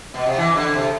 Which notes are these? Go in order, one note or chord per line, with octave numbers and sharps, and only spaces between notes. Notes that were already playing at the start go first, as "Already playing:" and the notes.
B2
C3
E3
D3
C3